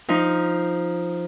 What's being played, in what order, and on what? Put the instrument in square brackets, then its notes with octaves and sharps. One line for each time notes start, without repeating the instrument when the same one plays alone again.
[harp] F3 D#4